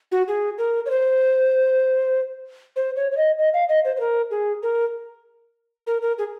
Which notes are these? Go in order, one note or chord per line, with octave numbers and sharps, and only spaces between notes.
F#4
G#4
A#4
C#5
C5
C5
C#5
C#5
D#5
D#5
F5
D#5
C5
C5
A#4
G#4
A#4
A#4
A#4
G#4